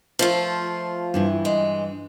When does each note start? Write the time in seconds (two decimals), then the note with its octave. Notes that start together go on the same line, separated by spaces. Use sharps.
0.19 F3 A3 F4
1.14 G2 E3 E4
1.45 G#3